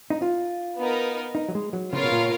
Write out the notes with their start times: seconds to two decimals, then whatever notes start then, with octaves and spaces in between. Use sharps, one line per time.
0.10 D#4
0.22 F4
0.78 B3 D#4 A#4
1.35 D#4
1.49 F#3
1.55 G#3
1.73 F#3
1.92 C#3 B3 F4 A#4 C#5 F5
2.03 B2
2.12 A#2